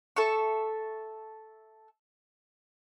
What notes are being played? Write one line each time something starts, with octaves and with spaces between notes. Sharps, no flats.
A4 E5 C#6